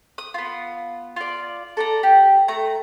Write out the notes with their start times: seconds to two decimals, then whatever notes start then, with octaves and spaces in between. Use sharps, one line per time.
0.18 D#6
0.34 B3 F4
1.16 F4 D5
1.77 A4 D5 A#5
2.03 G4
2.48 A3 A#5